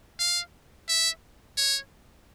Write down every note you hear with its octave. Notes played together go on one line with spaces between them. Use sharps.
F5
E5
C#5